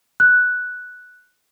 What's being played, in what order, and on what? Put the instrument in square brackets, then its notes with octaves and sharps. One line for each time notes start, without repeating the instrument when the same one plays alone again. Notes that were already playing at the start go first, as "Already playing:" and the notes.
[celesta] F#6